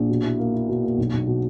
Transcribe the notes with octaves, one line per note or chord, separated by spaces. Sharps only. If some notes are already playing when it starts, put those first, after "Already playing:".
Already playing: A#1
B2
E4
A#3
E4
B2
A#3
B1
B1
B2